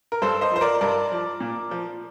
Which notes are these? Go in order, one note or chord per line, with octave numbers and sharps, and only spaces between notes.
A#4
G2 A4 C5
C5 D#5
F3 C5
A#4 D5
G2 A#4 D5
F3
A#2
F3